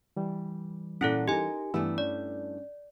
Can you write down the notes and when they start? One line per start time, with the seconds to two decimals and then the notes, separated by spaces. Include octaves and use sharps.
0.16 E3 G3
1.01 A#2 C#4 E4 A4 F#5
1.28 D#4 G4 A#4 G#5
1.74 G2 E3 A3 B3 E4 E6
1.98 C#4 D5